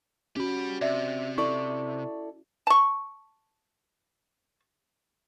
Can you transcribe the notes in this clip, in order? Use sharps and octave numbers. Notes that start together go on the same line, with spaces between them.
C#4 F#4 G4 B5
C3 D5 E5
E4 A4 D5 C#6
A5 C#6